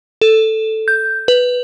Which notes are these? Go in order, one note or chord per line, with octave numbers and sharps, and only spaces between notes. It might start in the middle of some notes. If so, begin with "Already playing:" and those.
A4
G6
B4